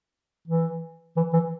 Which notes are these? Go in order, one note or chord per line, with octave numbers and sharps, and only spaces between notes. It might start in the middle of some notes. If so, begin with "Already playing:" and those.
E3
E3
E3